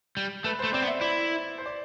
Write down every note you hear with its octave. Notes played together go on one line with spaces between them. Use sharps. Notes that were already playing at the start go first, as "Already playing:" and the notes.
G3
A3 B4
A3 C5
C4 D5
B3
E5
E4 D5
C5
D5